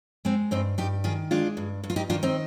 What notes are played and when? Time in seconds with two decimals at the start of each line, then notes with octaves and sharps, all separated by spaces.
0.25 G#3 C4
0.51 G2 C4 D#4
0.78 G2 D#4 G4
1.04 D#3 F4 G#4
1.31 G#3 D4 F4
1.57 G2
1.84 G2
1.90 F4
1.96 D#4 G4
2.10 D#3 D4 F4
2.23 C4 D#4